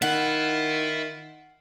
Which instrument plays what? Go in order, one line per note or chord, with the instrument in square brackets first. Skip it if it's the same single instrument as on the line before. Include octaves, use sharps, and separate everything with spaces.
[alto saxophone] D#3 [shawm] F4 [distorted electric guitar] E5 B5 [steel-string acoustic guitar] F#5